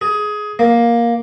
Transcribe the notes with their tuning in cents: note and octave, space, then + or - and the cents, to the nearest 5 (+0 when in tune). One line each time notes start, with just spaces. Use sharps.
G#4 +15
A#3 +10